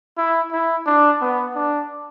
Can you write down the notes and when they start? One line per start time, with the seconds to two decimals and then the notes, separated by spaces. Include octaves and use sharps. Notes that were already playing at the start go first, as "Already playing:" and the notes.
0.17 E4
0.52 E4
0.86 D4
1.21 B3
1.55 D4